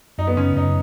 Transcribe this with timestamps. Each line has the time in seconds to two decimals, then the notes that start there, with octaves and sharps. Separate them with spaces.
0.18 F#2 D#4
0.27 B3
0.37 C#3 C#4
0.56 F#2 D#4